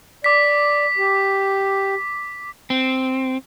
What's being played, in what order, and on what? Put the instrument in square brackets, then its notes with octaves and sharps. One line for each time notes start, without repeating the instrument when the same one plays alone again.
[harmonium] D5 [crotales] D6 B6
[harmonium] G4
[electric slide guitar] C4